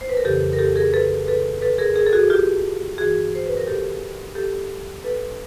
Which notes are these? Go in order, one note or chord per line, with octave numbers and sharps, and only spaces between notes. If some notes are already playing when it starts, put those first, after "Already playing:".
C5
B4
A#4
F2 C#3 E3 G4 A4
A#4
G4 A4
G#4 A#4
A4 B4
A4 B4
A4 B4
G#4 A#4
G#4 A#4
A4
F#4 G#4
F4 G4
G2 E3 F#4 G#4
C5
B4
A#4
G4 A4
G4 A4
A4 B4